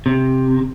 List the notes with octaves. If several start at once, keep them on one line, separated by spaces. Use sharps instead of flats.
C3